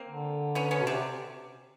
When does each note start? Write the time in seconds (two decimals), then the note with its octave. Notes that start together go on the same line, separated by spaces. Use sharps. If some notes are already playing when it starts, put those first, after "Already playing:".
Already playing: A#3 C4
0.08 D3
0.55 B3 C#4
0.71 B3 C#4
0.81 B2
0.87 C3 C4 D4